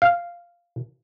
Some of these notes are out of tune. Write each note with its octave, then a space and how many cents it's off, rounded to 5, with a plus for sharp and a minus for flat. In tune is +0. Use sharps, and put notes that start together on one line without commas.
F5 -5